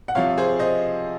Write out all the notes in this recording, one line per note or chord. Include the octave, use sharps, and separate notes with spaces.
F#5
C3 F3 C#5 F5
G#4 C5
C5 D#5